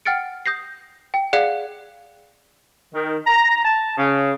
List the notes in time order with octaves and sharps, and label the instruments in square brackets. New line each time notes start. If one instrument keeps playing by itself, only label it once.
[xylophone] F#5 G5 F6 A6 C#7 D7
D#6 G6 A#6 C7
G5
G#4 D5 F5 F#5 F#6 C#7
[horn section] D#3
A#5
A5
C#3